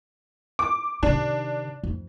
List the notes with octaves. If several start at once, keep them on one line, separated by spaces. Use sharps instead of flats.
D6
C3 D#3 D4
F2